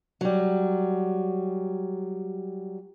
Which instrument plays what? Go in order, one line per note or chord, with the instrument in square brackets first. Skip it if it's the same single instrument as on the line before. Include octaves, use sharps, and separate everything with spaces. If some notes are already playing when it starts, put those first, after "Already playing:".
[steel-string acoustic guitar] F#3 G3